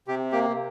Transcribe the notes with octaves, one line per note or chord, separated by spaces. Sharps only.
C3 G4
A#3 G4